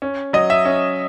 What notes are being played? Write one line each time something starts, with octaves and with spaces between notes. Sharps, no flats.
C#4
F#3 D#5
E5
C#4